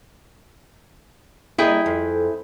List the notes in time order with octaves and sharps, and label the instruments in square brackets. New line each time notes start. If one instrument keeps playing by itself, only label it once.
[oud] A#3 D4 D#5 [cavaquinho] E4 G#4 G5
[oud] F2